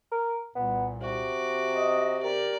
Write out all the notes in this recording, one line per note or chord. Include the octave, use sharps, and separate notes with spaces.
A#4
C2 A#2 B3
C3 F#4 D6
D#5
G4 A#4 D5